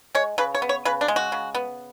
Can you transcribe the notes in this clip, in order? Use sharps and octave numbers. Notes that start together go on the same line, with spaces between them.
G#3 C#5
C#3 B4
C#5
B3
C#5
C#3 B4
D4
G#3
F#4
C#3
B3